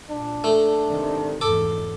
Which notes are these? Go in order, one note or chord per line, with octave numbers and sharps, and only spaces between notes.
A#2 D4
A3
G#2 C3 D#3
F1 E2 G#2 A4 D6